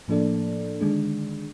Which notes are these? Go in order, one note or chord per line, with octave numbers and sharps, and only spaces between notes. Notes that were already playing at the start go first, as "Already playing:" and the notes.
A2 F3 A#3 D4 A4 D5
D3 D#3 G#3 D4